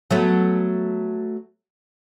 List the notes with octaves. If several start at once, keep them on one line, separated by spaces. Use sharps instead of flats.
F#3 A3 B3